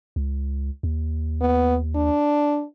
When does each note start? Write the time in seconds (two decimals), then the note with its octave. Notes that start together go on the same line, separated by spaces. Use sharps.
0.16 C#2
0.83 D#2
1.41 B3
1.95 D4